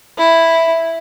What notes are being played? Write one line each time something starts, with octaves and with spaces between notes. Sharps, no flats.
E4